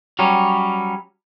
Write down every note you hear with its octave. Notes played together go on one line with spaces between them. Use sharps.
F#3 G3 C#4